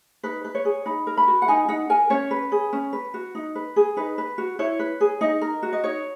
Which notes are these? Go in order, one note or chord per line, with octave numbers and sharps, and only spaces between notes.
D#4 B4
B4
C#5
G#4
D#4 B5
A#4
B5
F#4
F#5
D#4 G#5
D#4 F#5
A#4 G#5
C#4 C#5
B4
G#4
C#4
B4
F#4
D#4
B4
G#4
D#4 B4
B4
F#4
E4 C#5
B4
G#4
D#4 D#5
A#4
F#4
D#5
D#4 C#5